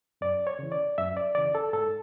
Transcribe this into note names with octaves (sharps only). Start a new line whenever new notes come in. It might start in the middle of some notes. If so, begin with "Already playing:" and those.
F#2 D5
C#5
C#3 E3
D5
F#2 E5
D5
C#3 E3 D5
A4
G#2 A4